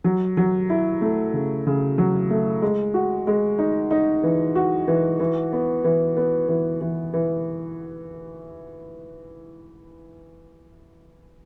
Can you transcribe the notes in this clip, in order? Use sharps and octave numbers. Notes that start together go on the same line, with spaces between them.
F#3
F#3
E4
A3
C#3
C#3
F#3
A3
G#3
F#4
G#3
D#4
D#4
E3
F#4
E3
E3
B3
E3
B3
E3
E3
E3